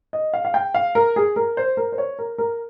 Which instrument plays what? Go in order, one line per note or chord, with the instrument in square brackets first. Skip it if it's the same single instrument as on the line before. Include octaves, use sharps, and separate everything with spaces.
[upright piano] D#5
F5
F5
G5
F5
A#4
G#4
A#4
C5
A#4
C5
C#5
A#4
A#4